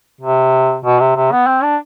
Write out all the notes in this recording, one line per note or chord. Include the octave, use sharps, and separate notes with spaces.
C3
B2
C3
C3
B3
C4
D4